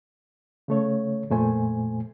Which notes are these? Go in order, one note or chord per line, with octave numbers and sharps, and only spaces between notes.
C#3 A3 C#5
F2 A#2 A3 C5 G#5